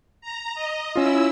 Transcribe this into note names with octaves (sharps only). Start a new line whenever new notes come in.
A#5
D#5
C#4 E4 F4 E6